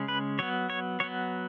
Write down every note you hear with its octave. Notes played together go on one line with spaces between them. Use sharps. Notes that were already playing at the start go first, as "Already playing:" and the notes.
Already playing: C#3 G#3 C#4
B4
F#3 B3 C#5
C#5
F#3 B3 C#5